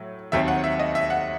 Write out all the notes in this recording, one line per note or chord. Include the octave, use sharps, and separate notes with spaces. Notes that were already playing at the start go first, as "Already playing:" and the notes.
Already playing: A2 F#3
D#2 D#3 F#3 C4 E5
F#5
E5
D#5
E5
F#5